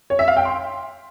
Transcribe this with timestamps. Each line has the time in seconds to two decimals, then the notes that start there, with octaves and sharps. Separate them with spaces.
0.10 C#5
0.19 E5
0.28 F5
0.37 G5
0.45 C6